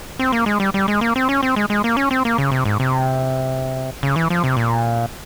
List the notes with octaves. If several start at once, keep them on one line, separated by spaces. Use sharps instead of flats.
C4
A#3
G#3
G3
G3
G#3
A#3
C4
C#4
C4
G#3
G#3
A#3
C#4
C4
A#3
C#3
C3
G#2
C3
C#3
E3
F3
C3
A#2